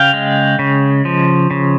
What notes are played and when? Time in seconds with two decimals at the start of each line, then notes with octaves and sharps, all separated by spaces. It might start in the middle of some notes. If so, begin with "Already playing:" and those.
Already playing: C#3 F5 G5
0.14 G#3
0.59 C#3
1.05 F3
1.51 C#3